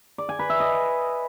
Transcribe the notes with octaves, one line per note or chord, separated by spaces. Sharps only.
D5
G#5
B4
E5
D#5